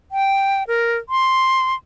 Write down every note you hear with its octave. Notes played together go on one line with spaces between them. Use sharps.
G5
A#4
C6